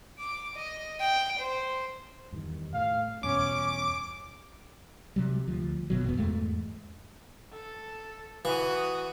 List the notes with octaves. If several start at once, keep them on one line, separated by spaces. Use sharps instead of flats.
D6
D#5
G5
C5
E2 G2 D#3
A2 F5
E2 G2 B2 C#4 D6
C3 F#3 G3
D2 F3
G1 B2 F#3
D1 E2 B3
E2 G#2 G#3 A3
A4
E3 F#4 D#6